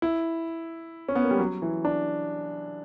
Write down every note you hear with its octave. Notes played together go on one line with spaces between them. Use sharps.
E4
C#4
B3
A#3
G3
F#3
E3
D4